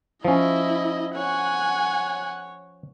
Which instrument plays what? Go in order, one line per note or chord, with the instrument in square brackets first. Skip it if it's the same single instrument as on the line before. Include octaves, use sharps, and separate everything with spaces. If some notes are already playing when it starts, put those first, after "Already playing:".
[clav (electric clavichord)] F3 C#4 [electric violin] E4 D#5
[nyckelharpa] C#5 [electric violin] F#5 G#5